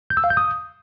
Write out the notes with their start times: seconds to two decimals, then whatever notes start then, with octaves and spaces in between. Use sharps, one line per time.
0.10 G6
0.17 E6
0.24 F5
0.30 G6
0.37 D#6